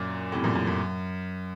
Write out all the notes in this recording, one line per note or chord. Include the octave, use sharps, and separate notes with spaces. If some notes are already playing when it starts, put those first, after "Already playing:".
Already playing: F#2 A#2
A2 C3
F#2 A#2
F#2
F#2